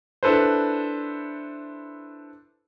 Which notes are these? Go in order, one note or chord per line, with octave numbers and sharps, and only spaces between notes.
D4 E4 A4 B4 C5